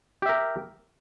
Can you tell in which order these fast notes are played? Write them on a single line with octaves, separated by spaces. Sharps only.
G4 E5 A#4